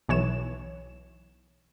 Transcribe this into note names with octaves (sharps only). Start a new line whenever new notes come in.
B1 E3 C#5 E7